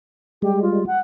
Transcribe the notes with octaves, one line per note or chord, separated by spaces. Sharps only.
G3 G#3 G4
F4
F#5